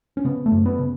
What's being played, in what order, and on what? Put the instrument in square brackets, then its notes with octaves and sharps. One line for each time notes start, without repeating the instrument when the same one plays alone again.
[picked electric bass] C#4
C#3 B3
A3
F#2
B3
C#3